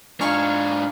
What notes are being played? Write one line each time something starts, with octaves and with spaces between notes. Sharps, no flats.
G#2 D4 D#4 F4 G#5 C#6 F6